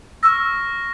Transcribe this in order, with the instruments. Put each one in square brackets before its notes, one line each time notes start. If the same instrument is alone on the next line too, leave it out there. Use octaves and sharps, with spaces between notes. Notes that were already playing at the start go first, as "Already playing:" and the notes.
[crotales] C#6 F6 A#6 [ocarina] E6